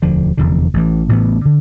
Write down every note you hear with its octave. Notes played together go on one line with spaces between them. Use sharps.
E1 D2 D3 F3
F1 E2 D3
A1 A2 E3
A1 A2 E3 B3
D3